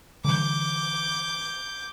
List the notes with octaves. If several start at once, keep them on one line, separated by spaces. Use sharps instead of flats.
D3 E3 G3 D6 G6